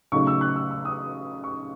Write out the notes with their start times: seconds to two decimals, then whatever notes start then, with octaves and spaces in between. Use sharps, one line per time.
0.12 C#3 F#3 A3 D#4 C#6
0.27 E6
0.41 F#6
0.56 E6
0.71 E6
0.85 D#6
1.44 C#6